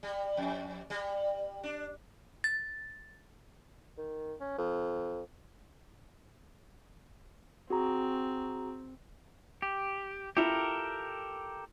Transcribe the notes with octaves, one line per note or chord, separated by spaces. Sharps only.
G3
F2
G3
D4
A6
D#3
C#4
F2
C4 F#4 G#4 A#5
G4
E4 F4 G4 A4 A#4